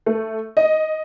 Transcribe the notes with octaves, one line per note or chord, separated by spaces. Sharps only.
A3
D#5